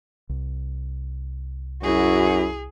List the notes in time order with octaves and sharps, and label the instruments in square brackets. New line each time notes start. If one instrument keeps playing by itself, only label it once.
[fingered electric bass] C2
[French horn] F#2 [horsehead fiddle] E4 F#4 [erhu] G#4